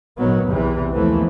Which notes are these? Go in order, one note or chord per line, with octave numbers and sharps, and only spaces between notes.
G#1 A#2 D#3 F#3 B3
B1 E2 C3 E3
D#2 E3 F3 A3 B3